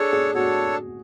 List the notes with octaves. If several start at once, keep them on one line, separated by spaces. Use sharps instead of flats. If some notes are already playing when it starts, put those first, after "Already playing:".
Already playing: D4 G#4 A4 C#5
G#4
D4 F#4 A4 C#5